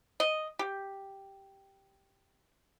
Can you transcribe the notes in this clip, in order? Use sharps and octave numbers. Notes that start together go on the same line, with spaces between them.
D#5
G4